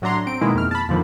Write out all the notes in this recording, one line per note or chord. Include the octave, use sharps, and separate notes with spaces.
A2 F#3 D4 A#5 C6
C4 D7
B2 D#3 G#3 A#3 E4
F2 F6
A5 B5
F2 A#2 D3 D#3 F3